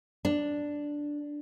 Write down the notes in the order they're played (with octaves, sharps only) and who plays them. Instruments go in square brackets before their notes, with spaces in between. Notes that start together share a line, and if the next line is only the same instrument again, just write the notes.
[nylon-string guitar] D4